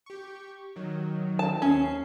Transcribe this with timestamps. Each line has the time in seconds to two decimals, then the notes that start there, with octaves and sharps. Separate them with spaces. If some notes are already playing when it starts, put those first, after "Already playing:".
0.06 G4 C#6
0.76 D#3 F#3
1.39 A5
1.62 D#2 C#4 C7